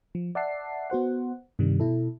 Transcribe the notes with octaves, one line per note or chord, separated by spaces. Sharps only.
F3
D5 E5 F#5 A5 C7
B3 F#4 C5 F#5
G2 C3 D#3 G3
B2 E4 A4